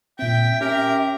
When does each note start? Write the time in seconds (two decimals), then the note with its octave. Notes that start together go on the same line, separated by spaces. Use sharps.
0.19 A#2 C4 E5 G5
0.61 C#4 G4 A#4